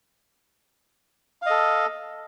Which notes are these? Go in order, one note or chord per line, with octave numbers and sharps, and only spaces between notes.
A4 D#5 F5